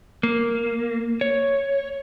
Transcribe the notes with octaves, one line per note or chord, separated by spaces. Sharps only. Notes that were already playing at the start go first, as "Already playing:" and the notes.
A#3
C#5